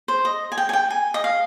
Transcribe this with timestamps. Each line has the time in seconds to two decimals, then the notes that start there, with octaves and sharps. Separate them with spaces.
0.08 C5
0.25 D#5
0.52 G#5
0.58 G5
0.69 G#5
0.73 G5
0.90 G#5
1.14 D#5
1.24 F5